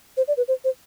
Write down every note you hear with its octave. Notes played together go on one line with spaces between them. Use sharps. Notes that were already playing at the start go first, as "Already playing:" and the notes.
C5
D5
B4
C5
C5